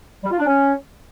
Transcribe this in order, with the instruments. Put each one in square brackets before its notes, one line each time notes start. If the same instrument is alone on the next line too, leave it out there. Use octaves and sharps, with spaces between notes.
[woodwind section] G3
F4
D4
C#4